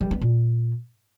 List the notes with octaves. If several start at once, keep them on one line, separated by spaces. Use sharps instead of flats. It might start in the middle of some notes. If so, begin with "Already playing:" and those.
G3
B3
A#2